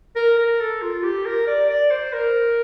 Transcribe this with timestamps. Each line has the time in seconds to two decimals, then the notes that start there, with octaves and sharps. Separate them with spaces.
0.16 A#4
0.38 A#4
0.60 A4
0.82 F4
1.03 G4
1.25 A#4
1.47 D5
1.69 D5
1.91 C5
2.13 A#4